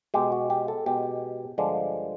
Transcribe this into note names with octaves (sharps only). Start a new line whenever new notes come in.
B2 G#3 G4
F#4
G4
A4
B2 G#3 G4
G2 D3 F3 G#3 D4